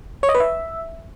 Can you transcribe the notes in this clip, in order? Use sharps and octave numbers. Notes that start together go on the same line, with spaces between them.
C#5
D#5
B4
E5